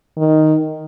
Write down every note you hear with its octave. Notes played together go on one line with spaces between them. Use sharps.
D#3